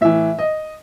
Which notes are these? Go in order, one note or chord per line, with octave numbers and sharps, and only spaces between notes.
A2 E3 E5
D#5